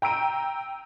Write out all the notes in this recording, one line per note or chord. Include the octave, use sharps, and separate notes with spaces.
G5 A#5 E6 D7 D#7